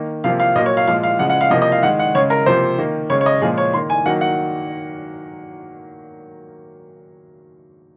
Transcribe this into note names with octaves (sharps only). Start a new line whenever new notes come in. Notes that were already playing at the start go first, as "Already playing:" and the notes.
Already playing: D#3 A#3
C3 F3 A#3 F5
F5
A#2 F#3 A#3 D#5
C#5
F5
A#2 F3 G#3 F5
F5
C#3 F3 G#3 F#5
F#5
F5
C3 F3 A#3 D#5
D#5
F5
D#3 G#3 F#5
F#5
C#3 G#3 C#5
A#4
C3 F3 A#3 C5
D#3 A#3
C#3 G#3 C#5
C#5
D#5
A#2 F3 G#3 G#4
C#5
D#3 A#3 C6
G#5
D#3 F#3 A#3 F#5
F#5